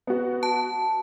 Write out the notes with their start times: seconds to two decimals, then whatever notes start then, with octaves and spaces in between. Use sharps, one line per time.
0.07 B3 F#4
0.43 A5